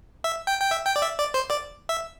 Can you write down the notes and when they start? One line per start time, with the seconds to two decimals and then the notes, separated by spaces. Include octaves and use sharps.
0.24 E5
0.47 G5
0.60 G5
0.71 E5
0.86 G5
0.96 D5
1.02 E5
1.19 D5
1.34 C5
1.50 D5
1.89 E5